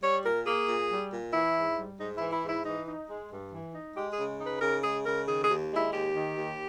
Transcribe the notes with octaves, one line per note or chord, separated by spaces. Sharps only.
G3 C#5
A#2 A#4
A#3 G#4
A#2
G3
A#2
E3 E4
G#2
G3
G#2 D#4
E4
E3
E4
G#2 E4
E3 D#4
D#4
G#3
G2
E3
D#4
G#3 G4
G#4
C#3
D#4
B4
C#3 A#4
G#3 G#4
C#3 A#4
D#3 G#4
G#4
D#2
G#3 E4
D#2 G4
D#3
D#2